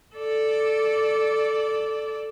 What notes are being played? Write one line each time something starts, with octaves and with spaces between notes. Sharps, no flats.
A4 D5